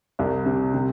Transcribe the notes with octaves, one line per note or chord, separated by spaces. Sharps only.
C2
C3
C3